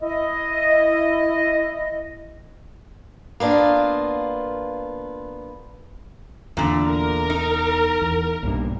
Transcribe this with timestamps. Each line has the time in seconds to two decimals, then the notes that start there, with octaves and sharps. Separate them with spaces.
0.02 E4 D#5
3.40 A#3 B3 D4 F4
6.57 E2 A#2 D3
6.86 A#4
7.30 D#4
8.02 E2
8.43 B1 G2 A#2